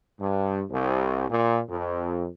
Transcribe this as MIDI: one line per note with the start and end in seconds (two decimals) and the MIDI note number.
0.20 0.62 43
0.70 1.29 36
1.29 1.60 46
1.69 2.28 41